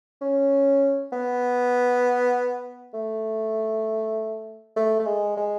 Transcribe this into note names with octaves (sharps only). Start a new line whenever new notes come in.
C#4
B3
A3
A3
A3
G#3
G#3